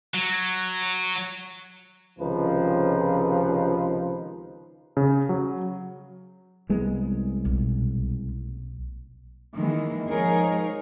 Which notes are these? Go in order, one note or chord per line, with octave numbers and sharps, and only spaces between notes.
F#3
C#2 C3 D#3 F3 D#4 B4
C#3
F#3
C2 G#3 B3
B1 A#2
D#3 E3 G#3 A#3
F3 G#3 D#4 G#4 A#4 C#5